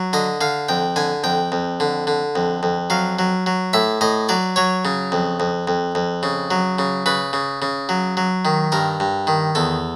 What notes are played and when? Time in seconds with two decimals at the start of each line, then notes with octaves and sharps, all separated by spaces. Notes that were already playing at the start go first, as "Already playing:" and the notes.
Already playing: F#3
0.13 D3 D#5
0.41 D3 F5
0.69 F2 G5
0.96 D3 G#5
1.24 F2 G5
1.52 F2
1.80 D3
2.07 D3
2.36 F2
2.63 F2
2.90 F#3 F5
3.19 F#3
3.46 F#3
3.73 A2 E5
4.01 A2 D#5
4.29 F#3 D5
4.56 F#3 C#5
4.85 C#3
5.12 F2
5.40 F2
5.68 F2
5.95 F2
6.23 C#3
6.51 F#3
6.79 C#3
7.06 C#3 B4
7.33 C#3
7.62 C#3
7.89 F#3
8.17 F#3
8.45 D#3
8.72 G2 A#4
9.00 G2
9.27 D#3
9.55 E2 A4